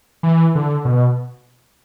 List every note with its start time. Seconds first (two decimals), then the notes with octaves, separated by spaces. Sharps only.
0.23 E3
0.55 D3
0.85 B2